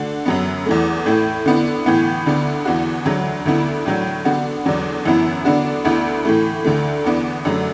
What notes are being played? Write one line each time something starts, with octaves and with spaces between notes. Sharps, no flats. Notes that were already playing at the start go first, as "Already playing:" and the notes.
Already playing: D3 A3 F#4
F#2 F#3 B3
E2 E3 A3
A2 A3 E4
D3 B3 E4
A2 E3 B3
D2 D3 B3
E2 E3 B3 F#4
D2 D3 F#3
D2 D3 B3 E4
A2 F#3 D4
D3 B3 F#4
E2 D3 F#3 D4
F#2 E3 B3 E4
D3 B3 D4 F#4
D2 D3 B3 E4
A2 E3 A3
D2 D3 A3
E2 E3 B3 D4
F#2 D3 F#3 A3